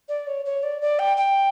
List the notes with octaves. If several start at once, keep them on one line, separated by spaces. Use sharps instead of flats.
D5
C#5
C#5
D5
D5
G5
G5